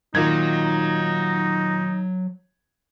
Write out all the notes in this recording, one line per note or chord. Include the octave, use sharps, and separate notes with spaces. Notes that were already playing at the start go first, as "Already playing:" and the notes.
A#2 D#3 F#3 D#4 G#6